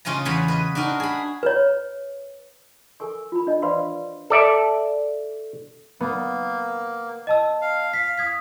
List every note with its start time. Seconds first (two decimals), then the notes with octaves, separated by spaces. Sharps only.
0.05 C#3 C#4 F4 D#5 A#5
0.25 E2 C#3 B4 C#5 D5 B5
0.48 B4 D#5
0.75 D4 D#4 F#4 A#4
1.00 G#4 B5
1.43 B4 C#5
3.00 A4 A#4 G#5 C#6
3.32 F4 B5
3.47 D4 D#5
3.62 B4 C5 D5 F5 B5 C6
4.30 A4 D5 E5
6.01 A#3 B3
7.27 D#5 A5 E6
7.62 F5
7.93 F5 B6
8.18 D#6 G#6 B6